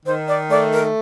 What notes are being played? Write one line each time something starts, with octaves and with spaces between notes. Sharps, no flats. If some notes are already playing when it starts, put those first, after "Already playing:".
D#3 C5
D5
A3 D5
A#4